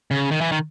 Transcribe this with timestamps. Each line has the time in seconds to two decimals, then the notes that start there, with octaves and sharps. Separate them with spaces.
0.11 C#3
0.31 D#3
0.41 E3
0.52 D#3